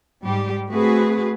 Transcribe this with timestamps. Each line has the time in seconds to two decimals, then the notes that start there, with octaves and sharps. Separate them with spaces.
0.23 G#2 G3 G4
0.69 A3 C4 F#4 G#4 B4